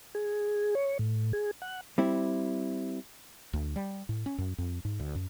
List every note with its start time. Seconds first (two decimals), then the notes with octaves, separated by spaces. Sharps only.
0.15 G#4
0.75 C#5
0.99 A2
1.33 G#4
1.62 F#5
1.98 G3 C4 E4
3.53 D2
3.76 G3
4.09 A2
4.26 C#4
4.38 F#2
4.58 F2
4.85 G#2
5.00 D2
5.15 F#2